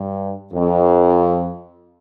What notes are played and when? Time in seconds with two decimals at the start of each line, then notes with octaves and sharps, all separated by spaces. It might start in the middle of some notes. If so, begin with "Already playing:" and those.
Already playing: G2
0.53 F2